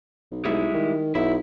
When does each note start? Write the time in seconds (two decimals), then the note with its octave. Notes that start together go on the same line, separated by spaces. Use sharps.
0.31 B1
0.45 B1 G3 G#3 E4
0.74 D#3
1.15 B1 E4